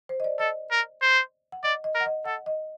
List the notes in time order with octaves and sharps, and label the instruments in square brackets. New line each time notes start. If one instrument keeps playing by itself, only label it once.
[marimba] C5
D#5
D5
[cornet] A4 [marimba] D#5
[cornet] A#4
C5
[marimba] F#5
[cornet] D5 [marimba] D#5
[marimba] D#5
[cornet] A#4
[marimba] F#5
D#5
[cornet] A4 [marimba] F#5
[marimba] D#5